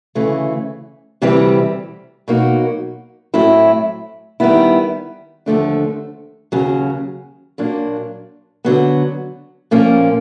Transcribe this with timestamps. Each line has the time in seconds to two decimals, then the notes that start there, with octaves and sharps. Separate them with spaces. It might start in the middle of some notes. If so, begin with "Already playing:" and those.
0.15 D2 C#3 E3 A3
1.22 D2 C3 E3 G3 C4
2.28 B2 F#3 A#3 D#4 F#4
3.34 A2 F#3 A3 C4 E4
4.40 D#3 G3 B3 E4
5.46 D#2 D3 F3 A3 D4
6.52 D#2 C#3 F#3
7.58 A#2 F#3 A#3 D4
8.65 D3 F#3 B3
9.71 A#2 F3 A#3 C#4